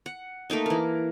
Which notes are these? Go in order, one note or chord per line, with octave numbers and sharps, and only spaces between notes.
F#5
A3 A#3 D#4 D#5
E3 A#4